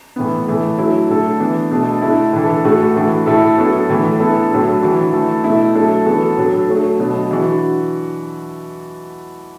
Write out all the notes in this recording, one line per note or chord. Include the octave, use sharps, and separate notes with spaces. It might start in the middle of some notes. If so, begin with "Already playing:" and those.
A2 E3 B3
A2 E3 A3
D3 F#3 A3 E4
A2 A3 D4 A4
E3 B3 D4
B2 A3 D4 A4
D3 A3 E4 A4
A2 E3 D4 A4
A2 A3 F#4 A4
A2 E3 A3 D4 F#4
A2 A3 E4 A4
F#3 B3 D4 F#4 A4
A2 E3 A3
D3 B3 E4 A4
A2 F#3 D4 A4
E3 D4 F#4
E3 A3 E4 A4
B2 A3 E4
F#3 A3 D4 A4
E3 B3 F#4 A4
A2 F#3 D4 A4
F#3 A3 F#4 A4
B2 F#3 D4
E3 D4 F#4